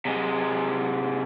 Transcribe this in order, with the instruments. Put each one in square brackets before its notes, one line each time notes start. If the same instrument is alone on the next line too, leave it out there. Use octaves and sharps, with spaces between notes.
[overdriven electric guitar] C3 G#3